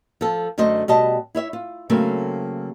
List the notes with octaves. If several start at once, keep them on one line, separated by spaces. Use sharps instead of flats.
F3 A4
F#2 D3 A3 C5 D#5
B2 G3 D#5 A5
E4 C#5 E5
F4
C#3 F#3 A3 A#3 C4